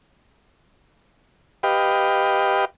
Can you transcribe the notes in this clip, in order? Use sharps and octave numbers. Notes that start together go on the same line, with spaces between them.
G4 B4 D#5 F5 G5